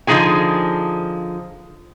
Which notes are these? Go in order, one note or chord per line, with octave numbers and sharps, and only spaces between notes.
D3 F3 D#4 G#4 G#5